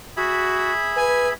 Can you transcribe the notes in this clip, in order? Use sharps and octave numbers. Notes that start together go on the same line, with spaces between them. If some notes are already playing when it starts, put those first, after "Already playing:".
F#4 G#4 E5 B5
B4 G#5